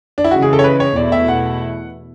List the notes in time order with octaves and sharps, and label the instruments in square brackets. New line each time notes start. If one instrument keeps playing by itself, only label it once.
[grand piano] D4
E4
[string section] C#3 E3 G#3 [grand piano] F#4
[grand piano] G#4
A4
C#5
B4
C#5
[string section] E2 B2 A3 E4 [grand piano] D5
[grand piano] E5
F#5